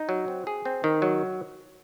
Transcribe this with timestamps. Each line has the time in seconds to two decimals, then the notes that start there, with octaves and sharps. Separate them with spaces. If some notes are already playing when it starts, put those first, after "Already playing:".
Already playing: D#4
0.09 F#3
0.28 C4
0.47 G#4
0.65 C4
0.84 D#3
1.02 F#3